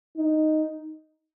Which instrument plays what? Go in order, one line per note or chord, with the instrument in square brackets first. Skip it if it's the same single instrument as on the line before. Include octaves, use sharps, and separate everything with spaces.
[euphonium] D#4